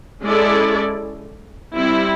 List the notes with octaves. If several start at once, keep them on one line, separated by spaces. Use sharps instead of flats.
G#3 C#4 E4 A4 D5
G3 C4 E4